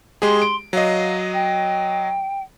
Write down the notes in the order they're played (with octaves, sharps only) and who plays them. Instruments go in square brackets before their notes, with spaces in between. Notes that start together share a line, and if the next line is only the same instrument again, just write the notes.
[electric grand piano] G#3 G4 G#4 [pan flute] C6
[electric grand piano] D7
[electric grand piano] F#3 D#5 [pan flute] F5
[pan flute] G5